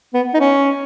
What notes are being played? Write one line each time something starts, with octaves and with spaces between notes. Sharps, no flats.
B3
D#4
C#4